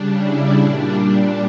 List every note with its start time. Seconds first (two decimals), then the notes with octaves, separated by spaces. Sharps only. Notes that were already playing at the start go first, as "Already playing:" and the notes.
Already playing: C#3 G3 D4
0.22 E4
0.57 A#2 G3 D4